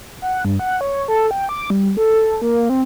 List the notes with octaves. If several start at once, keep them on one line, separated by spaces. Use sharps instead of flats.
F#5
G2
F#5
C#5
A4
G5
D6
G3
A4
A#3
C4